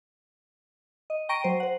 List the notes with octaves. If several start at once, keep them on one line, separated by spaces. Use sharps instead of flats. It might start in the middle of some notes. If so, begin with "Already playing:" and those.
D#5
G5 A#5 C#6 A#6 D7 D#7
F#3 C5
C5 F#5